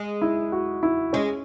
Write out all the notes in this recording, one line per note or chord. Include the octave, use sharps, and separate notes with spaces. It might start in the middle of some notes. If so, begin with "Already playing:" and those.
Already playing: G#3
E4
F#4
E4
G#3 C#4